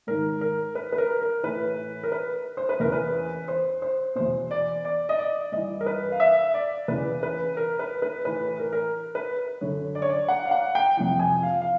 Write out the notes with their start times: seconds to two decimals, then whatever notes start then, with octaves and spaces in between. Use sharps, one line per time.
0.07 G#2 D#3 A#4
0.41 A#4
0.75 B4
0.92 B4
0.98 A#4
1.21 A#4
1.43 A2 E3 B4
2.03 A#4
2.12 B4
2.57 C5
2.69 B4
2.80 E2 C#3 E3 A#4
2.92 B4
3.48 C5
3.82 C5
4.15 E2 B2 C5
4.51 D5
4.85 D5
5.09 D#5
5.18 D5
5.52 G2 E3 D#5
5.81 A#4
5.86 B4
6.12 F5
6.20 E5
6.54 D5
6.88 E2 C#3 E3 B4
7.23 B4
7.57 A#4
7.79 B4
8.02 B4
8.25 A2 E3 B4
8.59 A#4
8.72 A#4
9.15 B4
9.61 F#2 D3 C#5
9.95 D5
10.02 C#5
10.09 D5
10.28 F#5
10.45 F5
10.51 F#5
10.75 G5
10.97 F2 C3 E3 G5
11.19 G#5
11.43 F5
11.61 F5